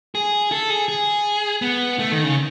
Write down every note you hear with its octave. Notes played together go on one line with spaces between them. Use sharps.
G#4
A4
G#4
G#4
B3
A3
D#3
C#3